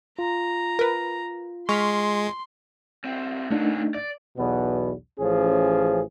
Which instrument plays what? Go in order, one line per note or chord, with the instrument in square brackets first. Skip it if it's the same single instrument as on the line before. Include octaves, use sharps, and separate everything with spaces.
[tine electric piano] F4 [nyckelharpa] A#5
[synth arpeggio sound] A#4 B4
[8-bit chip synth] G#3 [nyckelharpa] C6 [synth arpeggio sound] C#6 F6 B6
[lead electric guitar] C#2 C4
[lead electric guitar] A#2 D3 [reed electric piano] A3 D4 D#4
[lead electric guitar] D5
[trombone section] B1 E2 B2 B3
A1 F3 C#4 G#4